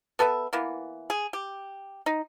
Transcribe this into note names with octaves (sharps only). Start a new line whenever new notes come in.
B3 A4 B4 E5
E3 A#3 B3
G#4
G4
D#4